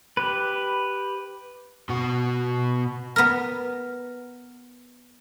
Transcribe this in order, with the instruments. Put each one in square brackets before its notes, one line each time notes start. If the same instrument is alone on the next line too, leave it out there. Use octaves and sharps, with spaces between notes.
[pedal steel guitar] G4 B4
[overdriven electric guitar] B2 F#4
[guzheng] B3 A#4